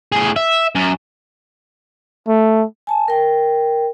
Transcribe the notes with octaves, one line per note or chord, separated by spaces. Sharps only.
A2 G#4
E5
F#2
A3
G#5 A5
A#4 G5